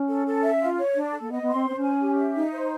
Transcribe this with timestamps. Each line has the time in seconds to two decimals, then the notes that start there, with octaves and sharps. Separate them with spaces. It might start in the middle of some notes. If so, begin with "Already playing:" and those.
Already playing: C#4
0.09 A4
0.26 A4
0.43 E5
0.61 F4
0.77 C#5
0.95 D4
1.13 A4
1.20 A#3
1.30 B3 D#5
1.42 B3
1.48 C6
1.54 C4
1.65 C4 C5
1.76 C#4
1.83 G#5
2.00 G4
2.17 E5
2.35 D#4
2.52 C5